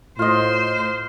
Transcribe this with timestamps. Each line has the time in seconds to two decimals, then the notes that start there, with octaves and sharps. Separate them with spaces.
0.19 A2 F4 C5 D#5